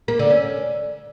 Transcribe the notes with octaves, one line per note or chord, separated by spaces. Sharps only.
A#3
D3
C#4